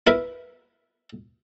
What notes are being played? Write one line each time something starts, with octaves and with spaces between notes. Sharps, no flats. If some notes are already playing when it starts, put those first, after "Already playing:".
E4 A#4 B4